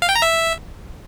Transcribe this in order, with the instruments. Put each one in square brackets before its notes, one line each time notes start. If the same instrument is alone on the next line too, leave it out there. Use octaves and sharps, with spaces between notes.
[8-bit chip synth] F5
G5
A#5
E5